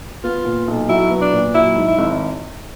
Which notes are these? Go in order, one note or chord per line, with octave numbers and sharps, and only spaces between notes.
B3 F4
A#2
B1
F#3 E4
B3
D4
A#2
F#3 E4
G#2
E4
G#1